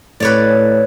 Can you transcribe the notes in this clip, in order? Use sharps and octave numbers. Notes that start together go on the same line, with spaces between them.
A2 B4 C#5 D5